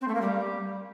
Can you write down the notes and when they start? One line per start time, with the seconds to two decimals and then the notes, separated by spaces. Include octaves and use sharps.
0.01 C4
0.08 A3
0.14 A#3
0.21 G3